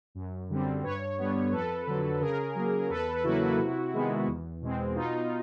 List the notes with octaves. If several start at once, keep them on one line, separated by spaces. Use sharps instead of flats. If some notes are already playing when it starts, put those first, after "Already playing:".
F#2
D3 G3 C4
G2 B4 C#5
D3 G3 B3
F2 A4 B4
D3 F#3
C#3 G#4 A#4
F#3 A#3
E2 A4 B4
C#3 F#3 A#3 E4 F#4
C3
D#3 G#3 B3
E2
B2 G#3 C4
B2 D#4 F4